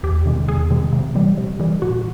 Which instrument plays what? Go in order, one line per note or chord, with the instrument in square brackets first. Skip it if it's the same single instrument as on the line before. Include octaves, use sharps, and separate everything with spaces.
[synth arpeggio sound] E2 G4
C3 D#3 G#3
E2 G#4
C3 D#3 G#3
C3
E3 G3
C3
E3 G3
A#2 F#4